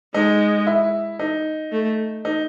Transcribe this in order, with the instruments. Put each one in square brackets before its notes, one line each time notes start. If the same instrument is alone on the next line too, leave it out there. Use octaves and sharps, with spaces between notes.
[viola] G#3 [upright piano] D#4
[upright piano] E4
D#4
[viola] A3
[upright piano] D#4